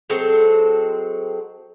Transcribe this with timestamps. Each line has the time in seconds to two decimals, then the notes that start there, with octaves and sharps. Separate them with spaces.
0.10 F#3 G#3 C4 A4